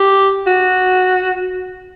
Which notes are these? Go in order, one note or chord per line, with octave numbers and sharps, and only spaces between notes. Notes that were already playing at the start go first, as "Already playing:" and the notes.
Already playing: G4
F#4